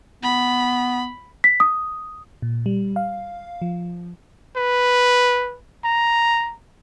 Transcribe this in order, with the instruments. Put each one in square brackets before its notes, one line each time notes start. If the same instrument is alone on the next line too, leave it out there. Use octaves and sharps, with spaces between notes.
[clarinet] B3 [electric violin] B5
[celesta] B6
D#6
[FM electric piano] A#2
G3
F5
F3
[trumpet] B4
A#5